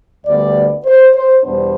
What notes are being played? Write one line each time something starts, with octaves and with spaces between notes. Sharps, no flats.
D2 D3 G3 B3 D5
C5
C5
E2 B2 G3 B3 D4 C5